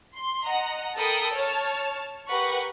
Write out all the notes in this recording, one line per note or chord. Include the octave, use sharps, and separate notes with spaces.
C6
D#5 F#5 A#5
A4 A#4 G5 B5 D#6
C#5 A5 F6
G4 A#4 B4 F#5 C#6